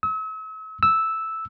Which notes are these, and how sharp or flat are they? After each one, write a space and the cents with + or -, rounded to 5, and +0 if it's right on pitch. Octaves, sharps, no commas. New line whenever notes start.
E6 -40
E6 -5